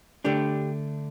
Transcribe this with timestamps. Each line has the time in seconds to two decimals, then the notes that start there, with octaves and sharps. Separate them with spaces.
0.24 D3 A3 D4 G4